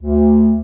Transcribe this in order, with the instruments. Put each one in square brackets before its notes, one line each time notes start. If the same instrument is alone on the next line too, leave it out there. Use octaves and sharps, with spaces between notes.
[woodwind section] D2